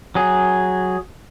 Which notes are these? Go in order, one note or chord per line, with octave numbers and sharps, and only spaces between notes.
F#3 G#4